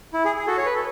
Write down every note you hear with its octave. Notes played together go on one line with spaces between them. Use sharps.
E4
G#4
G#4
F#4 A4
C#5
B4
A4